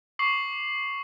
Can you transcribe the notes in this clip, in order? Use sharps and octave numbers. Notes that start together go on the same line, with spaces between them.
C#6 D6 C7 F#7